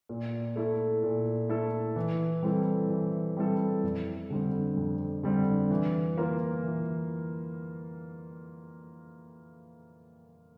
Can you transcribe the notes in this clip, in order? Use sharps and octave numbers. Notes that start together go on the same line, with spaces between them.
A#2
A3 E4 A4
A#2
A3 E4 A4
E3
G3 C4 E4 A4
E3
G3 C4 E4 A4
F2
D3 G3 C4
F2
D3 G3 C4
E3
A#3 F4 A#4
E3